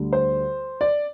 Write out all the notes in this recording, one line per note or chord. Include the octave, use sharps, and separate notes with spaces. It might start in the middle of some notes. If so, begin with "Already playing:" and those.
Already playing: D2 D3 G3
C5
D5